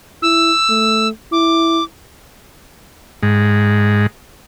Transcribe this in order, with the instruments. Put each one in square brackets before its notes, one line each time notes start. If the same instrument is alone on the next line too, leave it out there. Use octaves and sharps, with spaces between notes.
[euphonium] E4 [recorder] E6
[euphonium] A3
[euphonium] E4 [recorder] D6
[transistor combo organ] G#2